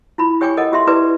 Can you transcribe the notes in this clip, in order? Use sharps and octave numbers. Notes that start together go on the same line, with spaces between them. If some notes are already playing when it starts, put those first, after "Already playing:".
E4 F4 B5
G4 C#5 G5 G#5 C#6 D6
A4 A#4 D#5 F#5 D6
F4 G4 E5 C6
E4 G4 B4 D5 D6